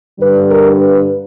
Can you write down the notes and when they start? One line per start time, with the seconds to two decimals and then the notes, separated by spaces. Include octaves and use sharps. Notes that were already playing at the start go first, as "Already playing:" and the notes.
0.20 G2 D3 G3 B4
0.49 A#4
0.78 B4